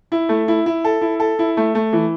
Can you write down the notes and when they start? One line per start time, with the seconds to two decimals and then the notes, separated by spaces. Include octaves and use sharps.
0.12 E4
0.29 A3
0.48 E4
0.66 E4
0.84 A4
1.01 E4
1.20 A4
1.39 E4
1.57 A3
1.75 A3
1.93 E3